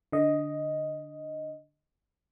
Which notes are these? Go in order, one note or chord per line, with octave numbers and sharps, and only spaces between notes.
D3 D#5